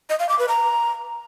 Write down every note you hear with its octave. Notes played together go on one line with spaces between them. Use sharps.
D#5
F5
D6
B4
A#5